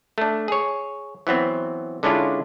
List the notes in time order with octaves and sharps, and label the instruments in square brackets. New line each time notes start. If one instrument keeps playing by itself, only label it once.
[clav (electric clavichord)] A3 D4
G#4 C#5
E3 F#3 B3 C4
D3 G#3 C#4 D4 E4 F4